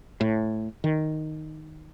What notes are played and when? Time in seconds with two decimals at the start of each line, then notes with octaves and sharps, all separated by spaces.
0.21 A2
0.84 D#3